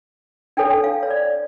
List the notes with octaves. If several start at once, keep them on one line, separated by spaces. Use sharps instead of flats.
D4 A4 C#5 G5
F5
C#5
D5